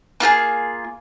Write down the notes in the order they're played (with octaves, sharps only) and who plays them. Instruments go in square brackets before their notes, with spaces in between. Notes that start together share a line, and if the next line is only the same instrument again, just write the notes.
[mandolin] A#3 F4 G4 G#4